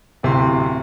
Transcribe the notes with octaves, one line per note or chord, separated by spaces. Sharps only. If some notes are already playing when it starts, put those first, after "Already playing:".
D1 C3 E4 C6